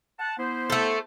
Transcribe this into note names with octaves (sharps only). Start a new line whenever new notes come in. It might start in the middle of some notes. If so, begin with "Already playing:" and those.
F#5 A5
B3 E4 C5
A3 A4